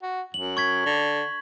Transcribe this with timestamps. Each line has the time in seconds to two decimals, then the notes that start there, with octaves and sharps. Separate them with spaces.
0.02 F#4
0.34 F#2 F#7
0.57 C#6 G#6 B6
0.85 D3